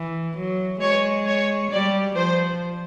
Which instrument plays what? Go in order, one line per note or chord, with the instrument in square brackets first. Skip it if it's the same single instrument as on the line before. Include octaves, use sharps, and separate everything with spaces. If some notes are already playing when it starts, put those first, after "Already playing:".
Already playing: [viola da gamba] E3
F#3
[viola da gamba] G#3 [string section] C#5
[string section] C#5
[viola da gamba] G3 [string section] D5
[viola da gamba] F3 [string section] C5